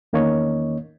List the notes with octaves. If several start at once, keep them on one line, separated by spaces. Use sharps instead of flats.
E2 D#3 A#3 C#4 C#5 D#5